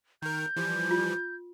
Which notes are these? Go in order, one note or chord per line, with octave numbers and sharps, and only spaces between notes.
D#3 A#4 G6
E3 F3 G3
F4